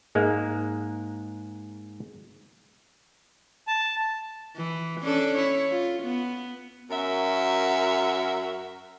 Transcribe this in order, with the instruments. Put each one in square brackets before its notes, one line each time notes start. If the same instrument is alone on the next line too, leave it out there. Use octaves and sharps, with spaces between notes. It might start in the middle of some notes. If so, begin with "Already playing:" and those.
[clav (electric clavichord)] G#2 G#3 A#3
[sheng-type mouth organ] A5
[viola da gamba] E3
C#4 D4 A4
E4 C#5
F4
B3
[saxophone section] F#2 F#4 A#4 E5